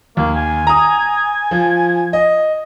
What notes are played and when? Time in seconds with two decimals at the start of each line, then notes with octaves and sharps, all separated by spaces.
0.17 D#2 A#3
0.36 G#5
0.67 A#5 D#6
1.51 F3
2.13 D#5